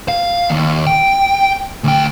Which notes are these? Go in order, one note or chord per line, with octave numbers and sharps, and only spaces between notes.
F5
D#2
G5
D2 G5